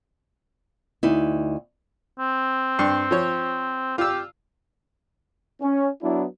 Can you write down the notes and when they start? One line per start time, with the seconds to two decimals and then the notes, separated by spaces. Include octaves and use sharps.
1.03 D2 D#4 E4
2.19 C4
2.79 G2
3.11 F3 C#5
3.98 F4 G4 E6
5.62 C#4
6.02 F#3 B3 D4 E4